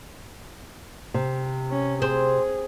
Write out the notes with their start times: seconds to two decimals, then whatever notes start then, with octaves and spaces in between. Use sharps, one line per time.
1.14 C3
1.71 C#4
2.02 C4 G#4